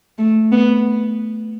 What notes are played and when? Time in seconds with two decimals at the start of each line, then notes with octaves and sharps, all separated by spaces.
0.18 A3
0.52 B3